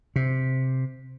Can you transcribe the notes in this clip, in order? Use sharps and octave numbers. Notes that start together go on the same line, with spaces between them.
C3